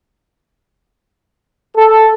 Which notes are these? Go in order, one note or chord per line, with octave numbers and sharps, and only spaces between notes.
A4